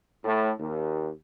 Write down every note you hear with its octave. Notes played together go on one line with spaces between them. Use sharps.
A2
D#2